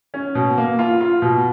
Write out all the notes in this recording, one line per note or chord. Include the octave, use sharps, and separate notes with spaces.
C#4
B2
A#3
F4
F4
B2